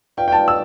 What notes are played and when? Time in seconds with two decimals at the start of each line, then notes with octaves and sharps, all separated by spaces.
0.17 F4 B4 D5 F5 G5
0.28 G5
0.32 A5
0.48 E6